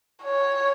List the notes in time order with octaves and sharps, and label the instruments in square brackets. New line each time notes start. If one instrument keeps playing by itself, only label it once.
[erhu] C#5